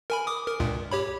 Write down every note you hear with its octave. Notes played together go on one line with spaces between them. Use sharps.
A#4 G#5 B5
D6 D#6
A#4
C#2 G2 A#2
G4 C#5 B5